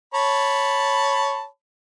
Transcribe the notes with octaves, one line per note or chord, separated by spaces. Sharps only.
C#5 A5 B5